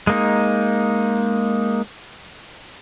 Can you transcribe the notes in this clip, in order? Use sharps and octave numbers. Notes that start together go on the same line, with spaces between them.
G#3 A#3 D#4